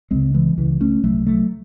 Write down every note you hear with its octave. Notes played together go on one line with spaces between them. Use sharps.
C#2 C#3 G#3 C4
E3 G#3
C#2 C#3 E3
A3 C#4
C2 C3 F#3 A3
F#3 A3